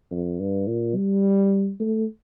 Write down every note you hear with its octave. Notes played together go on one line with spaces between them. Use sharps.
F2
G2
A#2
G3
A3